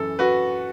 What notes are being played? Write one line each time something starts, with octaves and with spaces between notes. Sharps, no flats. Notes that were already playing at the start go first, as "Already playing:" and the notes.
Already playing: F#2 E3 C#4 A4
F#4 B4